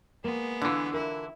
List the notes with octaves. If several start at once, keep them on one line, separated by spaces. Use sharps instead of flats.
G#3 A#3 B3
D3 E3 D4 F4
E4 A#4